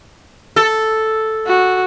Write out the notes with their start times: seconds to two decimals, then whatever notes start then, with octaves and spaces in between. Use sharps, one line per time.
0.56 A4
1.47 F#4